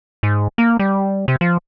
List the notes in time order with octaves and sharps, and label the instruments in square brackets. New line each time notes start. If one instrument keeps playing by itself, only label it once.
[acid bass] G#2
A#3
G3
C3
F3